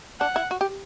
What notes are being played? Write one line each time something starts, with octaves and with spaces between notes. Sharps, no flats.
D4 F#5
E4
F#4
G4